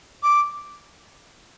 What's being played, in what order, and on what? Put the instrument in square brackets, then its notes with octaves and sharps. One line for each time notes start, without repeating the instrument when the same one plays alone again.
[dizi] D6